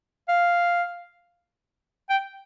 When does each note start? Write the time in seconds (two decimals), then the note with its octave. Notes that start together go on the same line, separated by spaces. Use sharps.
0.28 F5
2.10 G5